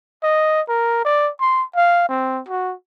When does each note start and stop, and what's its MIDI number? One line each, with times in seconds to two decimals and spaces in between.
0.23 0.61 75
0.69 1.02 70
1.05 1.30 74
1.40 1.64 84
1.76 2.08 77
2.09 2.41 60
2.48 2.74 66